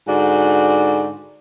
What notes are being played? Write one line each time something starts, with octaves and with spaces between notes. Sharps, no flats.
G#2 D3 F#4 D5